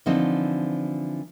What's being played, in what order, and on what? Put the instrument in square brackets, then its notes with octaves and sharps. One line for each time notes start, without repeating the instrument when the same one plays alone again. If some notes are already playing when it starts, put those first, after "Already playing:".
[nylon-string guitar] D3 E3 F3 C4 D#4